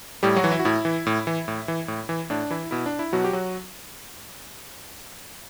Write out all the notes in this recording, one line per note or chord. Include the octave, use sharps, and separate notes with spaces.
A2 G3 G4
F#3 F#4
E3
E4
F#4
A2 E4
E3
A2
E3
A2
E3
A2
E3
A2 D4
E3 E4
B2 E4
D4
E4
B2 F#3 F#4
G4
F#3 F#4